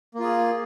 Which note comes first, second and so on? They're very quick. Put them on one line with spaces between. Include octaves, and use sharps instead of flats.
A#3 F4 G#4